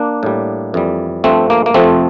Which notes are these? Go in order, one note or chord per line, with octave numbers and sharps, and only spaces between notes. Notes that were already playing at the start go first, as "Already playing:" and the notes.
Already playing: A#3 D4
A2 G3
F2 E3 G3
G2 F3 A3 C4
A#3
A#3
F2 C3 F3 A3 C4